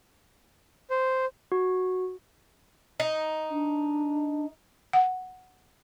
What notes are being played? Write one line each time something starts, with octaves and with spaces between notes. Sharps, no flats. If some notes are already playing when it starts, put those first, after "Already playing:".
C5
F#4
D#4
D4
F#5